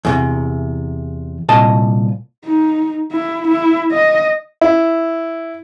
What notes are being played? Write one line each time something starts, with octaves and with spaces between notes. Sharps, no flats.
E2 A2 C3
C2 A#2 D#5 A5
D#4
E4
E4
D#5
E4